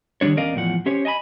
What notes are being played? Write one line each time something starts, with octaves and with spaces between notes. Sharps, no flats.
D#3 G3 D4 C#5
E2 C#4 A#4 D5 D#5 F5
E2 A2 F3 F#5
C#4 G4 C5 C#5
D#5 G#5 A5 B5